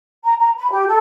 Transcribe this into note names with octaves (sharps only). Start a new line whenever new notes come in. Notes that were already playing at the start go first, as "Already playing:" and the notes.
A#5
A#5
B5
G4
A4